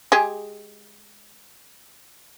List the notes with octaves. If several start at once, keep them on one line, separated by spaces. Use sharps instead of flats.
G#3 G4 G#4